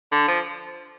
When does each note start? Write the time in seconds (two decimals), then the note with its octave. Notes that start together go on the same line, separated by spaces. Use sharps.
0.12 D3
0.28 F3